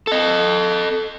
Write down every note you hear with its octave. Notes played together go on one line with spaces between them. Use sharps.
A4 D#5